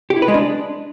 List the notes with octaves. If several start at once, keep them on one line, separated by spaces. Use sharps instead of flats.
G4
E4
B4
G#3
D4